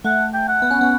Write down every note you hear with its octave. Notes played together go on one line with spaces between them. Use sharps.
A3 F#5
G5
F#5
B3
C#4
B3